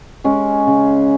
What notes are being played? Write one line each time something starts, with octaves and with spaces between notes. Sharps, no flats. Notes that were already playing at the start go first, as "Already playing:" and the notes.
G#3 C#4
C#3